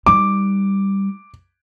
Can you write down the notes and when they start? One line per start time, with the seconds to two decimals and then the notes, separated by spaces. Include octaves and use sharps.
0.06 G3 D#4 D6